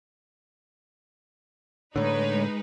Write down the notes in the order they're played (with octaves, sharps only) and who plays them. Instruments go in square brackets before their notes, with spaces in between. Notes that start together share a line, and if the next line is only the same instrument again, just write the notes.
[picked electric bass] A2 D3 [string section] G#3 D#4 B4 [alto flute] C#5